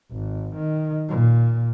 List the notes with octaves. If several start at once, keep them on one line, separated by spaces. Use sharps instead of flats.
G#1
D#3
A#2